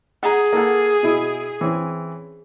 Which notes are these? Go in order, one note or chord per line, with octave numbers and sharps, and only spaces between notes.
G#4 F#5 A#5
A#3 A4 F#5
B2 E4
E3 C4 C#4